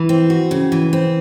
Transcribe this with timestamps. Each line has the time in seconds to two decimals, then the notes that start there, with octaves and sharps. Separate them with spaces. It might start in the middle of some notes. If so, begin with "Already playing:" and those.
Already playing: E3
0.09 C4
0.30 F#4
0.51 C#3
0.72 E3
0.93 C4